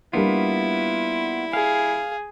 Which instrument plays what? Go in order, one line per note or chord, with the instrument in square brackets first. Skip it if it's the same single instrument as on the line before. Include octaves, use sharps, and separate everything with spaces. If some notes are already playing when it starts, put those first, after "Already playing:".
[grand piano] G3 A#3 D4 [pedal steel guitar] B3 F4 [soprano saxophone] E4
[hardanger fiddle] G#4 [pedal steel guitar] F5